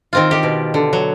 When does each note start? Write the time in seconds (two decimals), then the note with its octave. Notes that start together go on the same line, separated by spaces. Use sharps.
0.13 D#3 C4 F4
0.31 D#3 G4
0.43 B2
0.74 D3
0.93 F#3